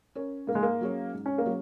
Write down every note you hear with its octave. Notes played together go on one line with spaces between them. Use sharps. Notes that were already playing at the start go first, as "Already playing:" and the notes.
C#4 A#4 C#5
G#2 A#3
G#3
A#3
F#3 C#4 G#4 C#5
G#2
C#4
A#3
F#3 C#4 G#4 C#5